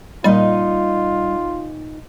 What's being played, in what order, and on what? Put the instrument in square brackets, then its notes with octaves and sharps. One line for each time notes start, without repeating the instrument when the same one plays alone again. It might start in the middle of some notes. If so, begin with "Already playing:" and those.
[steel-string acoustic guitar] A#2 D#4 D#5 [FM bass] G3 [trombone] F4